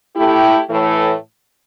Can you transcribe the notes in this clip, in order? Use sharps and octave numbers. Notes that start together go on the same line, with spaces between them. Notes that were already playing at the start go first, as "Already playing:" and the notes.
A3 E4 G4
A2 E3 A3